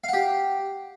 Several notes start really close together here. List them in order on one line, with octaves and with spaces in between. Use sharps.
F5 F#5 G4